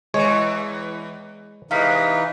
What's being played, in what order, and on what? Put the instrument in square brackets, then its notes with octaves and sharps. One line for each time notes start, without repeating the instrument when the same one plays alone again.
[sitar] E2 E3 [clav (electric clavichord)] G#3 C#5
[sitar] C3 G#3 [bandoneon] E3 D#4 [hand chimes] F5 F6 B6